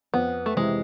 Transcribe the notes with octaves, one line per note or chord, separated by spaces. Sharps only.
F2 B3
A3
C3 E3 G#3